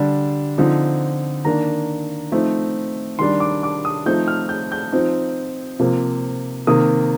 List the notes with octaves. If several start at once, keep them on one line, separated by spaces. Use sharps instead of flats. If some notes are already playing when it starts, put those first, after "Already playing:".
Already playing: D3 G3 D4
D3 F3 C4 D#4
D#3 A#3 D4 A#5
F3 A3 C4 D#4
D#3 G3 D4 C6
D6
D6
D#6
F3 A3 C4 D#4 G6
F6
G6
G6
F3 C4 D#4
C3 F3 A#3
C3 D#3 A#3 D#6